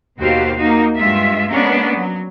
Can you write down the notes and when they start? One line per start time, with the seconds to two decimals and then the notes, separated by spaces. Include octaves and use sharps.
0.19 D#2 B2 F#4 G4 C5 F5
0.57 A#3 D#4 F#4
0.96 G2 G#3 F4 E5
1.50 G#3 A#3 B3 C#4 D4
1.95 F#3